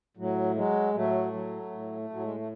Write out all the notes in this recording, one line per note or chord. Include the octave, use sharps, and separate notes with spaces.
A2 F#3
F#3 G#3
A2 F#3 A3
F#3
A2
A2 F#3
G#3
A3